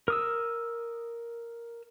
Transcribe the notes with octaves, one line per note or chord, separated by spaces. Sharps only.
A#4 D#6 E6